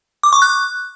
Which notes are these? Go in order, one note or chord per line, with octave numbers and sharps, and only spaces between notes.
D6
C#6
F#6